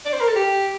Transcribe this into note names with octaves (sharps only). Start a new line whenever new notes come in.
D5
C5
A#4
A4
G4